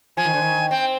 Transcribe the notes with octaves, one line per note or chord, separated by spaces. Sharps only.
F3 G#5
D#3
D3
D#3
C4 G5